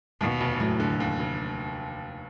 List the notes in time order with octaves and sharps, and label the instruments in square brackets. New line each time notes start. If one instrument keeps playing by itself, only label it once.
[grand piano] D#2 [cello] B2
[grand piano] F1
[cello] A2 [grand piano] F#3
[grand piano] D3
D#2
F1